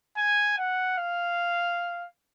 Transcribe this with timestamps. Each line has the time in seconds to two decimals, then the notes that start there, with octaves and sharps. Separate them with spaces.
0.17 G#5
0.58 F#5
0.98 F5